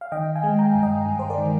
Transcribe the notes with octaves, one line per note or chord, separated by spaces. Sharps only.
F5
D#3 D#5 G5
F5 G#5
G#3
G5 A#5
G2
D#5 G5
G2
C5
A#4 D5
D#3